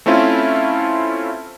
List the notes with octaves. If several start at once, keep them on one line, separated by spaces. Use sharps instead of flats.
A3 C4 C#4 E4 F4